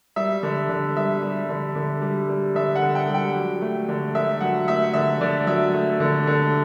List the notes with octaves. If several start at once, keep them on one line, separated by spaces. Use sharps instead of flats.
G3 E5
D3
D3
G3 E5
G3
D3
D3
G3
G3
D3 E5
F#5
D3
G5
G3
G5
F#3
A3
D3
D3 E5
F#3 F#5
A3 E5
D3 E5
D3 D5
F#3 E5
A3
D3
D3